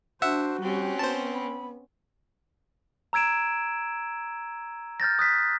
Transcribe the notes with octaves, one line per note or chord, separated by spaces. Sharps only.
D4 F#4 C5 E5 F#5 E6
G3 C4 C#4 G4
B3 C5 A5
B5
A#5 E6 G#6 D7 E7
F6 G6 A6 A#6
D#6 F#6 B6